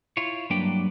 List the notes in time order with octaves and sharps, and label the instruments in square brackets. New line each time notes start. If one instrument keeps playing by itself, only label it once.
[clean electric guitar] E4 F4 C#5
G2 F#3 A#3 D4 B4 G5